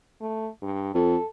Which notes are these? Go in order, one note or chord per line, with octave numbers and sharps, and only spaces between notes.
A3
G2
F2 A4